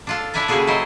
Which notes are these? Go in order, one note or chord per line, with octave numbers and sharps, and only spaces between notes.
D4 F4 A4
D4 E4 D5 E5 G#5 A#5
C#3 G3 A#3 F#4 G#4 A4
F#3 E4 C5 C#5 D#5